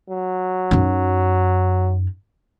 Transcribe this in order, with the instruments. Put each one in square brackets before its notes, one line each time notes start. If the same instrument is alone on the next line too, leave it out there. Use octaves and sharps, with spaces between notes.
[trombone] F#3
[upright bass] F#2 D#4